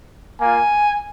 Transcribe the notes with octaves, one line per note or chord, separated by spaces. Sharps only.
A#3 F4 G#5